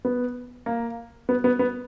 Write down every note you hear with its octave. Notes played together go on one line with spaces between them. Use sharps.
B3
A#3
B3
B3
B3